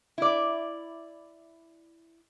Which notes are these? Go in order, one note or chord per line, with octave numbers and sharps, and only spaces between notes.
E4 D5